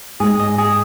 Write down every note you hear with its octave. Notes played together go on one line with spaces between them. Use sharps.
G#2 G#4
D#5
G#4